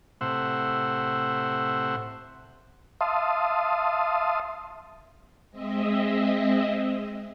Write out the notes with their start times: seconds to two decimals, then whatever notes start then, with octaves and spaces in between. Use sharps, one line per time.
0.21 A2 C3 C5 E5 F#5
3.01 E5 F5 A5 C6 D#6
5.50 G#3 C4 D#5 E5